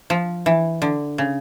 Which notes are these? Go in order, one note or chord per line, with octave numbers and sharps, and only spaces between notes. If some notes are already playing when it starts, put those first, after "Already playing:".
F3
E3
D3
C#3